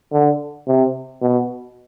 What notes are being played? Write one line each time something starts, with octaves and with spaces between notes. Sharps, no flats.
D3
C3
B2